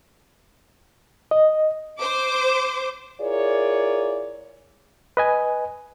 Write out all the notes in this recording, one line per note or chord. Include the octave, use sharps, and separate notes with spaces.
D#5
C5 D6
E4 F4 G#4 A#4 C#5 D5
B4 D#5 G#5